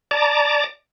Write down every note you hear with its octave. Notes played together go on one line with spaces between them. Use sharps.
D5 A5 A#5 D6